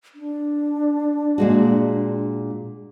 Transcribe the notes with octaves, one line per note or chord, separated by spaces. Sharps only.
D4
A#2 G#3 F#4